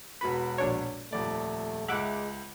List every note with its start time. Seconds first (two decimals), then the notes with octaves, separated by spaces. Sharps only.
0.21 E1 F#4 B4 B5
0.58 A#1 D4 C#5
1.13 D#1 F2 A3 D5
1.88 C#2 G#3 E5 F#5 D6 F#6 F#7